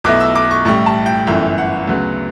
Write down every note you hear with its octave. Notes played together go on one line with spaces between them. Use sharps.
B1 B2 A3 E4 D6
E6
D6
C#6
A1 A2 G3 C#6
A5
G5
G1 F#2 E3 A3 G5
F#5
D2 C#3 F#3 B3